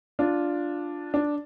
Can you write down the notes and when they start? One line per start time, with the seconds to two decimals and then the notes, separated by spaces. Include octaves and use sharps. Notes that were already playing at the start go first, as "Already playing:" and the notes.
0.19 D4 F4
1.14 D4